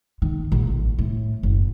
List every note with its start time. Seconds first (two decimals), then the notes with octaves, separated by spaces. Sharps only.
0.22 D#3
0.52 A#1
0.67 A1
0.99 A2
1.43 F#1